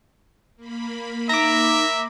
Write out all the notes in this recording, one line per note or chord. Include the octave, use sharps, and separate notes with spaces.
A#3 B5
D#4 E5 A#5 D6